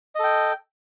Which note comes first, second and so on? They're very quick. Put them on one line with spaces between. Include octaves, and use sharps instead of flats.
D#5 A4 G5